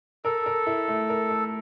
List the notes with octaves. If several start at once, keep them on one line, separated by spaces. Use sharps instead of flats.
A4 A#4
A#4
E4
A3
A#4
A3